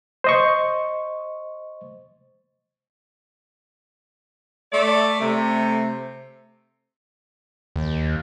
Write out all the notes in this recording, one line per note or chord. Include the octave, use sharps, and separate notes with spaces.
C5 D#5 C#6
A3 D5
C3 A3
D#2